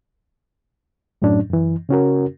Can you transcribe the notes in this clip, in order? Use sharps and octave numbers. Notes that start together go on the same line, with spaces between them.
F#2 A2 F#3 C#4 D4
F#2 E3
C#3 C#4 F#4 A#4